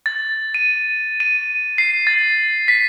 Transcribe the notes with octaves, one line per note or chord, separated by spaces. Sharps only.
A6
D#7
D#7
C7
A6
B6